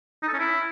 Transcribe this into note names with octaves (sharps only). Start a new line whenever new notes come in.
D#4
A4
C#4
E4